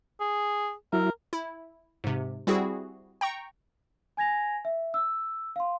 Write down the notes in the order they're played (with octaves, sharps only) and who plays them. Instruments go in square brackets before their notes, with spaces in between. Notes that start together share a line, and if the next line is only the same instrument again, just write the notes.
[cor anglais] G#4
[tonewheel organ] F#3 E4 [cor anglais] A#4
[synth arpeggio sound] E4
G#2 C3
G3 C4 E4 F#4 G#4
G5 A#5 C#6
[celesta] G#5 G#6 A#6 F7
E5
E6
F5 C6